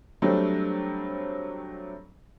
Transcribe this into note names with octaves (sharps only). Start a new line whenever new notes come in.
F#3 G3 A3 C4 D4